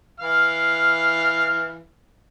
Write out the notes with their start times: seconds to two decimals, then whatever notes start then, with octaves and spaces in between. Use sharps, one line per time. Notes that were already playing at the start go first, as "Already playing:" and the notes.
0.20 E3 F5 F6